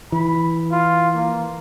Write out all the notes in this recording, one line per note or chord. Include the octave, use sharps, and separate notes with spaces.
E3 B5
F4
A#3